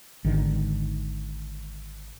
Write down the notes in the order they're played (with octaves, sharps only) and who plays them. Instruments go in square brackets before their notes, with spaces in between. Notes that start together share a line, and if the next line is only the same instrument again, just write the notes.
[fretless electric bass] G#1 D3 D#3